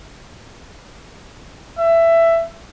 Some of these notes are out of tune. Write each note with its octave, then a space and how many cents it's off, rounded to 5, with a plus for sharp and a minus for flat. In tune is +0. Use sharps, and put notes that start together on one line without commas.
E5 +15